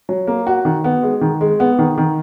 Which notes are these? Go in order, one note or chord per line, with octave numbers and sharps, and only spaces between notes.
F#3
A#3
F#4
D#3
B3
G#3
D#3
G#3
B3
D#3
D#3